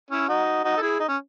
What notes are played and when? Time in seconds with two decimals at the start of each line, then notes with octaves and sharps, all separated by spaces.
0.10 C#4 E4
0.28 D#4 F#4
0.64 D#4 F#4
0.77 A4
0.81 E4 G#4
0.99 D#4
1.08 C#4